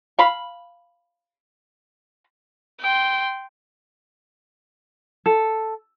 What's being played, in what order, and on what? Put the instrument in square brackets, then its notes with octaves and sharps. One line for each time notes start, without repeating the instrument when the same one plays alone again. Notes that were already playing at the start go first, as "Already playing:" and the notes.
[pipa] F5 B5
[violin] G5 C6
[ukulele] A4